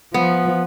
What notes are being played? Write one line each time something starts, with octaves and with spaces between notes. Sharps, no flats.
F3 B3